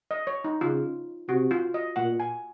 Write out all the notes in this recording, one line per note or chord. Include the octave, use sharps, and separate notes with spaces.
D#5
C#5
D#4
C#3 F4
C3 F#4
F4
D#5
A#2 F#5
G#5